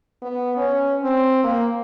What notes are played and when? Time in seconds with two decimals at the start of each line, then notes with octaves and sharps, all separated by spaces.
0.22 B3
0.57 C#4
1.03 C4
1.44 A#3